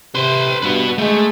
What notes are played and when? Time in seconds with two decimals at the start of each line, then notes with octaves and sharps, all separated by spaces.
0.15 C3 B4 C6
0.62 G2 F#4 B4
0.98 G#3 A3